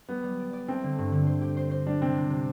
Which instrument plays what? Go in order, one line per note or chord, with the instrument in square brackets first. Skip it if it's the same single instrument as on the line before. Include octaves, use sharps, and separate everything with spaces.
[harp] G3 [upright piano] B3
[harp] G3
D5
D5
[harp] A3 [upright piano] C4
[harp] D3
G2
D3
C5
G4
C5
C5
[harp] G3 [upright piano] D4
[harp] C3 [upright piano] C4
[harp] C3
C3